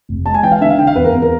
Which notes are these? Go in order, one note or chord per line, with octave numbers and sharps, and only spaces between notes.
F1
G#3 A5
G#5
E3 G5
F5
D3 E5
F5
D3 G5
F5
E2 B4
A#4
E2
A#4